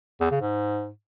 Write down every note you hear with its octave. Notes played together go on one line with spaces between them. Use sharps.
E2
C#3
G#2